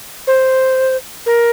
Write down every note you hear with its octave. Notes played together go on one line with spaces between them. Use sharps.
C5
A#4